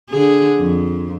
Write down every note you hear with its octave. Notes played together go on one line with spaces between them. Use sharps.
D3 G#4
F2